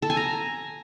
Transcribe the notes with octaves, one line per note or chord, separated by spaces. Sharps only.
A4
G#5
A#5